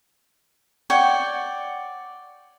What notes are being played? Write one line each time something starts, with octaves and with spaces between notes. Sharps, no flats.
C#5 D5 F#5 G5